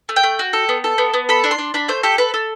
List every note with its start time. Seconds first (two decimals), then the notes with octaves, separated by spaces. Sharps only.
0.09 A3
0.16 G5
0.23 A3
0.39 F#4
0.53 A4
0.69 B3
0.84 A4
0.98 B3
1.14 B3
1.29 A4 B5
1.44 D4
1.51 C6
1.58 D4
1.74 D4 B5
1.89 A3 C5
2.03 G4 A4
2.18 A4 B4
2.34 A4